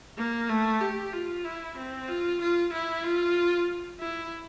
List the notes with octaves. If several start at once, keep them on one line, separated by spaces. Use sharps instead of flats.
A#3
A3
G4
F4
E4
C4
F4
F4
E4
F4
E4